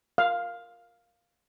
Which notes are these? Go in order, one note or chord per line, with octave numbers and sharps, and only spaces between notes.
F5